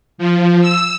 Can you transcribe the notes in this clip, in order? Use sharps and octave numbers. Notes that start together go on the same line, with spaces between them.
F3
E6